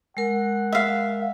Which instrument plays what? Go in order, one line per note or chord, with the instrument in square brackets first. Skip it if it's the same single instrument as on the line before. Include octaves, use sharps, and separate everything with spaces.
[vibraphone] G#3 A#4 [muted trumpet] F#5
[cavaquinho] E5 F5